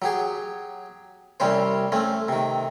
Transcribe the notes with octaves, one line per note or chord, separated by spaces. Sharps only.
F#3 G4 G#4
C2 C3 G3 C#4 C5
A3 C4 C#4
C3 D#3